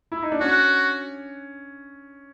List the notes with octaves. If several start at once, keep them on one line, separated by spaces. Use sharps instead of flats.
E4
D#4
D4
C#4 F#4